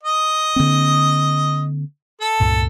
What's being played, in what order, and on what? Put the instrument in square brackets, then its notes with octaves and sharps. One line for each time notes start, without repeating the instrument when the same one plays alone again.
[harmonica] D#5
[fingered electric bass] D3 A#3 C4
[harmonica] A4
[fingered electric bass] C#2 G2 A#2